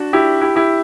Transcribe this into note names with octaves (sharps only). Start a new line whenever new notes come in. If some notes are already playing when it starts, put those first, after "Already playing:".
Already playing: D4 F#4
E4 G4
E4 G4
E4 G4